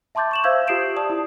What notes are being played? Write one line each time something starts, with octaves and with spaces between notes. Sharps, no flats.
E5 A5 C6 D6 G6 A6
C#6 E7 F#7
C5 E5 F5 E6 G6 G#6
F4 G4 D#6 C7 D7 E7
D5 A5 D#6
E4